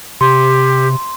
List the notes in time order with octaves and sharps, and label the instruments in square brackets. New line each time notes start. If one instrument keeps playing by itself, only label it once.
[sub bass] C3 [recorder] G4 [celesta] C6